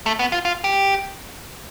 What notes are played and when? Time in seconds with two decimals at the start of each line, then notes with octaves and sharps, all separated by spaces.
0.06 A3
0.19 B3
0.32 F4
0.45 F4
0.64 G4